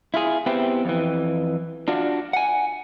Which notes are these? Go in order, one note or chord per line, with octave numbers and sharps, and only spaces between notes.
E4 F4 G#4
B3 C4 E4 G4
F2 E3
D4 F4 F#4
F#5 G#5